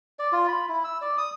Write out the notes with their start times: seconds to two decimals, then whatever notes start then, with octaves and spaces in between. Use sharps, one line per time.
0.19 D5
0.33 F4
0.48 B5
0.69 E4
0.84 E6
1.01 D5
1.18 D#6